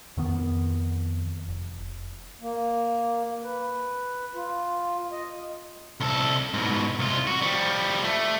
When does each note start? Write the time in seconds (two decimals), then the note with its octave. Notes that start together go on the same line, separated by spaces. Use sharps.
0.17 F2 D#3 B3
1.48 F1
2.41 A#3
3.44 B4
4.35 F4
5.12 D#5
6.00 C2 A4
6.54 G#2 B2
6.99 C2 F4
7.27 F#4
7.42 F3 G3
8.04 A3